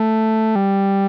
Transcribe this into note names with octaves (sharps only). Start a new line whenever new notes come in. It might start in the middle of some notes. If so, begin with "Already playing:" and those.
Already playing: A3
G3